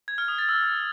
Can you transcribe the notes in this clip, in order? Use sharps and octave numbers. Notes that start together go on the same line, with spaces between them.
G#6
F6
D#6
A6
E6